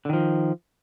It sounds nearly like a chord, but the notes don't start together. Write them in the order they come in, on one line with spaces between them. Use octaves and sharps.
D3 D#3 F3